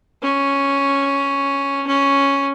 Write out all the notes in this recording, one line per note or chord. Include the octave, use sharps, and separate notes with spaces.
C#4
C#4